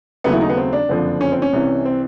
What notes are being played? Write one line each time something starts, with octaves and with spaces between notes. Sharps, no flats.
D#2 C#3 F#3 A3 B3
E4
D#4
B3
C4
D4
F#1 F2 D3 F3
C#4
C4
C#4
C2 C3 E3
C4